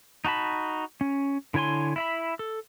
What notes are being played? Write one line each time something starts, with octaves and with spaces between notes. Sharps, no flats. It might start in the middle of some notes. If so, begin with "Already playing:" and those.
D#4 F#4 A5 B5
C#4
D3 E4 C#5 G#5 C6
E4 E5 B5
A4